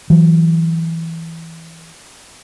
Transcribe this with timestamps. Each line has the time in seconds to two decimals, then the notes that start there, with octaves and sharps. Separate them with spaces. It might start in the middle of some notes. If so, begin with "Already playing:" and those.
0.10 E3 F#3